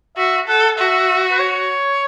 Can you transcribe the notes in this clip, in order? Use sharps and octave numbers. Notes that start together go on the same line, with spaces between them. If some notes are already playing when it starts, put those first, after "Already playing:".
F#4 E5
A4 F#5
F#4 E5
B4
C#5